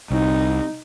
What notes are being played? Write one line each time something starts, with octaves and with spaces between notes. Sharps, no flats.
C2 D#4